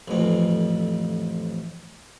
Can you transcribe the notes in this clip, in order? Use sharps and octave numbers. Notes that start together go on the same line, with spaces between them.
A1 F2